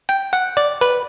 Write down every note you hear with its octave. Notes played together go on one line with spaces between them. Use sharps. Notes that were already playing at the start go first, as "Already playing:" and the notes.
G5
F#5
D5
B4